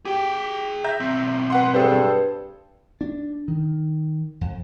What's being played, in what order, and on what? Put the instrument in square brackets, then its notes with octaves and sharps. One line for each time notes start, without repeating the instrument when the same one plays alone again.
[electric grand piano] G4 [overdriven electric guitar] G#4 G5
[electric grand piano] E5 A#5 G6
[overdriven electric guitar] B1 C4
[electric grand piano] B4 F#5 C6
[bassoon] G2 [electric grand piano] G#4 A4 C5
[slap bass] D4
D#3
F2